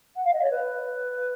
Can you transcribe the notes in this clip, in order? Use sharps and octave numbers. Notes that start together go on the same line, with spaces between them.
F#5
F5
D#5
C#5
B4